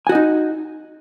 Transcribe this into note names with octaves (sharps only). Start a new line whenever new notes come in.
D#4 F#4 D#5 G#5